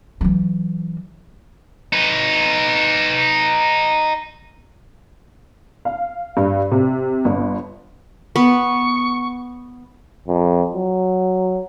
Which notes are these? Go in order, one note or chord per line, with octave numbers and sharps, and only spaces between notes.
E3 F#3
D#4 B4
F5
G2
C3
G1
B3 C#6
F2
F#3